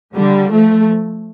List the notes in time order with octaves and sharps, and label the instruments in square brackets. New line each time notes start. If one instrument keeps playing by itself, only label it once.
[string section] D3 G3
F3 A3